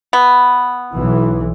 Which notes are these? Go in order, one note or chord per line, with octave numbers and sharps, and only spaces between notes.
B3
B1 E3